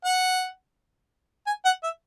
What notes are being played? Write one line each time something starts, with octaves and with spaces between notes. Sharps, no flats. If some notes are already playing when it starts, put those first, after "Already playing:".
F#5
G#5
F#5
E5